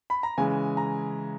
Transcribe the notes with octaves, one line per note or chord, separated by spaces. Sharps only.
B5
A#5
C#3 E3 G#3 G#5
A#5